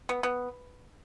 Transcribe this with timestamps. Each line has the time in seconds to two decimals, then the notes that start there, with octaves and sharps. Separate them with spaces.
0.09 B3
0.23 B3